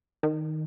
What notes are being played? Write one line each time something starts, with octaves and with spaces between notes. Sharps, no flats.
D#3